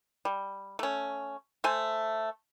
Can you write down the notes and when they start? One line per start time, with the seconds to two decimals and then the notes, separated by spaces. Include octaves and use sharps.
0.25 G3
0.79 A3 C#4
1.64 A3 C5 G#5